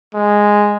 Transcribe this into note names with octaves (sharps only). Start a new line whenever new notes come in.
G#3